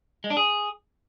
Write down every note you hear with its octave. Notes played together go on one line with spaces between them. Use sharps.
G#3
D4
G#4